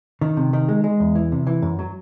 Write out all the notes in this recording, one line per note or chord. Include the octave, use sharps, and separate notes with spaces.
D#3
C3
D#3
G#3
G#3
E2
E3
C3
E3
F#2
F#3